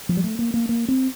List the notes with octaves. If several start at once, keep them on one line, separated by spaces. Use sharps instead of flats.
F3
G3
A3
A#3
A#3
A#3
C4